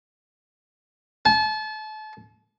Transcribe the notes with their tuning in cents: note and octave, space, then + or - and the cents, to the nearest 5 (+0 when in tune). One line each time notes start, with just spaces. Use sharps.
A5 -35